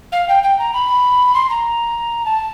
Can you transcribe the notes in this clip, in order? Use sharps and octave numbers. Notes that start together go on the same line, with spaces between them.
F5
G5
G5
A#5
B5
C6
A#5
A5